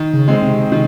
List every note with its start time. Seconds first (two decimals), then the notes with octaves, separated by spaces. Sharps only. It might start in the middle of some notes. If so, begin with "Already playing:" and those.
Already playing: D#3
0.13 C#3
0.28 G#3 C4
0.43 C3
0.71 C3 D#3